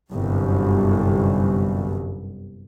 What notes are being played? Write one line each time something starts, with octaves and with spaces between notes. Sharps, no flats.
G1 C2 F#2